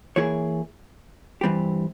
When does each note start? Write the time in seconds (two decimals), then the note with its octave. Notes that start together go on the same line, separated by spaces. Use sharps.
0.16 E3 A#3 E4 G#4 C#5
1.41 G2 E3 G3 C4 G4